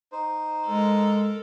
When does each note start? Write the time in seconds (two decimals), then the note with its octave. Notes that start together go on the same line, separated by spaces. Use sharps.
0.12 D#4 C5
0.67 G#3 A4 A#4